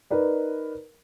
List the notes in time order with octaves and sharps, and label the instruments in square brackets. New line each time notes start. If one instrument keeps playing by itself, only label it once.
[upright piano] D#4 A#4 B4 D5